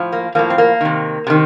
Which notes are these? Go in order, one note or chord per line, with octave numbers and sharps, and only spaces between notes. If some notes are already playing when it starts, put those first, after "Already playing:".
Already playing: A2 F3
A#3
A2 F3 A#3
C4
A#3
C3 D#3
C3 D#3